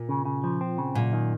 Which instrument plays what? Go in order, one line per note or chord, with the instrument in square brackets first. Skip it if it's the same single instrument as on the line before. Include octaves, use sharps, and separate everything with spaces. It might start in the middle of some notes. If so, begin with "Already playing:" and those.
Already playing: [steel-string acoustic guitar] A#2
[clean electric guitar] C#3
C#3
F3
C4
C#3
[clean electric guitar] F#2 [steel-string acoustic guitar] A#2
[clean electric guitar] D#3